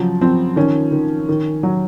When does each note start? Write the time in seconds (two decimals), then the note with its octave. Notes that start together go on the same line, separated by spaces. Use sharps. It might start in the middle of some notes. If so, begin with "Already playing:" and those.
Already playing: C#3 F3 F#3
0.21 F3 C4
0.56 D#3 C#4
0.92 D#3
1.29 D#3
1.63 F#3